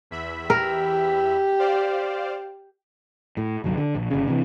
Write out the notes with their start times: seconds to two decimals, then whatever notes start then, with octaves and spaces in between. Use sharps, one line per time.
0.11 E2 E5 B5
0.50 G4 A#4
1.59 C5 D5 F5
3.37 A2
3.64 G1 C2 F#3
3.77 D3
3.95 A#1
4.10 G1 C#3
4.27 C3 E3